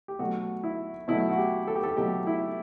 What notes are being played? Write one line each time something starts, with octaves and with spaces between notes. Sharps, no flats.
G4
B2 F#3 A3 F#4
E4
B2 F#3 A3 E4
F#4
G4
A4
G4
A4
B2 F#3 A3 G4
E4